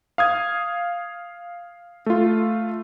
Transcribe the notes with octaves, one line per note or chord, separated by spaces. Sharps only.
F5 D#6 G#6
A3 F4